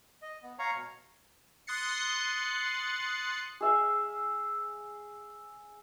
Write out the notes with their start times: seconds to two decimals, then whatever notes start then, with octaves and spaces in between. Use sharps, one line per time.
0.22 D#5
0.43 B3
0.59 C#5 F5 A#5 C#6
0.75 B2
1.67 C6 D#6 F#6 A6 C7 C#7
3.61 G#4 E5 F5